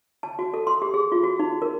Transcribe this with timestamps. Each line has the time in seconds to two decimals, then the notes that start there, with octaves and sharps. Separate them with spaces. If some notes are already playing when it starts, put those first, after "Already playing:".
0.23 A5
0.39 F#4
0.54 A4
0.67 C6
0.82 G4
0.94 G#4
1.12 F4
1.24 F#4
1.40 D#4
1.62 A#4